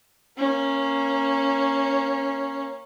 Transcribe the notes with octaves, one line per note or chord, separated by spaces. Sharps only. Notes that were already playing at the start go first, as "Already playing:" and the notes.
A#3 C#4